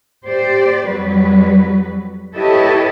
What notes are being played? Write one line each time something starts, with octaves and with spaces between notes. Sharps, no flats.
G4 C5 D5
F2 F#3 G3 B4
E4 G4 A4 B4 C#5 D#5